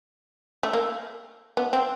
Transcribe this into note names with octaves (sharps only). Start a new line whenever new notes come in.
A3
A#3
B3
C4